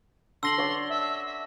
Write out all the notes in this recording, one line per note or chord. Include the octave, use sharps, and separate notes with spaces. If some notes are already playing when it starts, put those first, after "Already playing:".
D3 C6 E6 A#6 F#7
C#5 D5 F#5
E5
E5